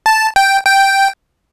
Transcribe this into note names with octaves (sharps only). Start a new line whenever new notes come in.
A5
G5
G5